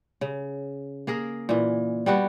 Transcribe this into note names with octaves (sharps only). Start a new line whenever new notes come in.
C#3
A#3 G#4 A#4
A#2 E3
G3 B3 F#4